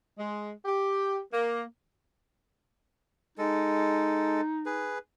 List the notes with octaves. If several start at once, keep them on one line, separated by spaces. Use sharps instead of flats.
G#3
G4
A#3
G#3 D#4 A4
G#4 B4